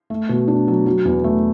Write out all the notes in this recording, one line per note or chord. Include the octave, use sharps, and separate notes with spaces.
A3
B2
D4
F#3
F#3
E2
A3